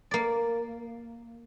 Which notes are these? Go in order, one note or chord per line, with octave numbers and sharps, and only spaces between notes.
A#3 D5